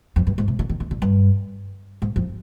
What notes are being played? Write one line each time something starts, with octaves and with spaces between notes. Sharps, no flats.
F2
G2
G#2
C3
D3
D#3
D#3
D3
G2
G#2
F2